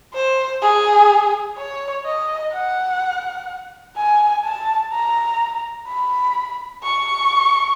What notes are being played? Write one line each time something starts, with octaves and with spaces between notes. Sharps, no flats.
C5
G#4
C#5
D#5
F#5
G#5
A5
A#5
B5
C#6